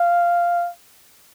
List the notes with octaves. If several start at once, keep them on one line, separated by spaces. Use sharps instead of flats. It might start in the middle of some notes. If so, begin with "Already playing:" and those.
Already playing: F5